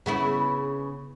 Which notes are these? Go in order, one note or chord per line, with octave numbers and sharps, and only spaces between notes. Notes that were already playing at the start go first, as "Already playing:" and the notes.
C#3 B3 E4